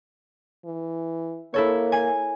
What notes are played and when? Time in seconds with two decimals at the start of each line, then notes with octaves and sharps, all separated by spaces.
0.65 E3
1.54 A#3 E4 A4 C#5
1.92 G#5